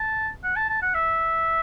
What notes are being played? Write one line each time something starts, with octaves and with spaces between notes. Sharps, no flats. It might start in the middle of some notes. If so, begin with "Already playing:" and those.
Already playing: A5
F#5
A5
A5
F#5
E5